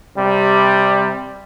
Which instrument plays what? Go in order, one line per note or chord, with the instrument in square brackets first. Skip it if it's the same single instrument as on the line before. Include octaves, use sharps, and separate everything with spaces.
[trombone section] C3 G3